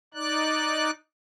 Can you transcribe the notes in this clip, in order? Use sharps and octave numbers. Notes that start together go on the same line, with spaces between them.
D#4 D5 F#6